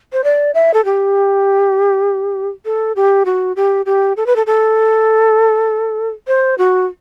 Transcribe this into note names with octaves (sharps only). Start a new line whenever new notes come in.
C5
D5
E5
A4
G4
A4
G4
F#4
G4
G4
A4
B4
A4
A4
C5
F#4